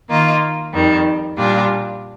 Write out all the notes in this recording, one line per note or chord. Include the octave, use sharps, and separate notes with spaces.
D#3 A#3 F4
F2 D#3 G3
A#2 G3 D4 F4